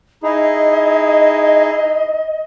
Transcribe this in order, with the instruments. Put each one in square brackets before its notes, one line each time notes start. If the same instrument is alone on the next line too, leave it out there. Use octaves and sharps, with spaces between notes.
[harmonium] D#4 E4 G#4 [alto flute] D#5